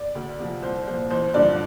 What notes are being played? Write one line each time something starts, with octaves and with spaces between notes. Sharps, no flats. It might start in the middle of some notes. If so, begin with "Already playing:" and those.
Already playing: D5
D2
C3 F3
C2 C5
A#2 F3 C5
A1 C5
G2 D3 F3 D5